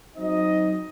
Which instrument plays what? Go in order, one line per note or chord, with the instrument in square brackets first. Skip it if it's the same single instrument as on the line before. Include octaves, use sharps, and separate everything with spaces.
[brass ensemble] F#3 C4 D#4 D#5